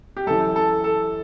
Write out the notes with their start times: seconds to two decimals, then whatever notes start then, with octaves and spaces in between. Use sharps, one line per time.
0.17 G4
0.26 F#2 E3 A4
0.56 A4
0.84 A4